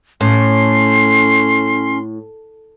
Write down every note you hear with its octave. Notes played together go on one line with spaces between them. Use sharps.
A2 C#4 C6